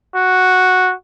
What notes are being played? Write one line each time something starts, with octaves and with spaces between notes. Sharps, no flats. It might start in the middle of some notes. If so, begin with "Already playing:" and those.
F#4